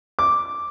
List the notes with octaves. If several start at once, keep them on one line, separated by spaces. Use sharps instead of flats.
D6